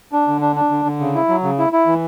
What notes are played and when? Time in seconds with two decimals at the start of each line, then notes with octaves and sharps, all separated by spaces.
0.12 D4
0.28 D3
0.41 D4
0.56 D4
0.70 D3
0.85 D3
1.00 C#3
1.15 E4
1.29 F#3
1.43 C#3
1.58 E4
1.73 E4
1.87 E3